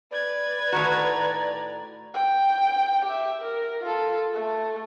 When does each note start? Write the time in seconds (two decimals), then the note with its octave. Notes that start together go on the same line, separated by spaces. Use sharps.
0.11 B4 D5 G#6
0.72 A2 D#3 F#4 A#5
2.14 G5
3.05 G4 E5
3.41 A#4
3.81 F4 A4
4.34 A3